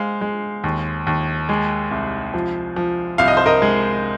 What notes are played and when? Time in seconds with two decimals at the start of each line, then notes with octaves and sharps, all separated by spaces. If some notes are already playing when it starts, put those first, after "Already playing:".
Already playing: G#3 C5 F5
0.21 G#3
0.64 D#2
1.07 D#2
1.49 G#3
1.91 C2
2.34 F3
2.76 F3
3.18 C2 F5
3.28 D#5
3.37 C5
3.46 A#4 D#5
3.62 G#3